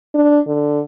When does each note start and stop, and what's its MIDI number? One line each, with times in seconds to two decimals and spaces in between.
0.15 0.39 62
0.47 0.81 50